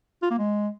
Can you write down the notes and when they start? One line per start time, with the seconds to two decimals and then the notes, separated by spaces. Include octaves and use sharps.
0.22 F4
0.30 A#3
0.38 G#3